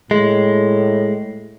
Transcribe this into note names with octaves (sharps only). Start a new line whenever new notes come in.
A2 G#3